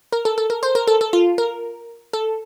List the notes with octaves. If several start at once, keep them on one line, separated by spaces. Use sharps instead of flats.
A#4
A4
A4
A#4
C5
A#4
A4
A4
F4
A#4
A4